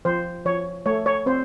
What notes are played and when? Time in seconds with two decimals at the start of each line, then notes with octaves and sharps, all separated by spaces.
0.05 F3 C5
0.46 F3 C#5
0.86 A3 C#5
1.06 C#5
1.26 C4 C5